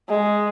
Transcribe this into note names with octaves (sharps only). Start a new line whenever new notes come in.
G#3